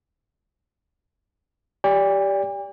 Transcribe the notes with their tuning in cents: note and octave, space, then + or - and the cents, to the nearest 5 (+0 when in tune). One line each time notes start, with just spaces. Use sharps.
G4 +0 D5 -20 G5 +45